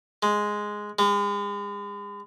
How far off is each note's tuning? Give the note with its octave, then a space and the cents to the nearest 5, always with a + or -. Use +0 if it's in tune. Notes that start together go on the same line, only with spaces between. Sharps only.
G#3 +0
G#3 -40